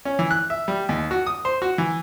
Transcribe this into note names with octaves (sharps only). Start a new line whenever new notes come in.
C#4
E3
F#6
E5
G3
D#2
F#4
D#6
C5
F#4
E3